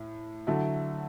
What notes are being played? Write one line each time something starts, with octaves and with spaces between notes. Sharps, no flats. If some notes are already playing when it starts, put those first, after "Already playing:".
Already playing: A2
D3 F#3 A3 E4